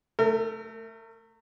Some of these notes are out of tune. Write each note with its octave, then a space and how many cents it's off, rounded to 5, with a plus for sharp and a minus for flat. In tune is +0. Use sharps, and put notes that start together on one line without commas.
A3 +0 A#4 -40